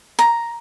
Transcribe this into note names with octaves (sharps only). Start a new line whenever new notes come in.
A#5